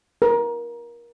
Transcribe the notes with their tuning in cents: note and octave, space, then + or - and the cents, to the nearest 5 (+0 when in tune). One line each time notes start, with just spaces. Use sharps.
A#4 +25